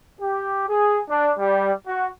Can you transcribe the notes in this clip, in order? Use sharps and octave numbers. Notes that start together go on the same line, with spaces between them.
G4
G#4
D4
G3
F#4